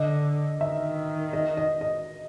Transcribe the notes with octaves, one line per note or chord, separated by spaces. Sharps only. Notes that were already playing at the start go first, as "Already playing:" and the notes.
Already playing: D3 D#5
D#3 E5
D#5
D#5
D#5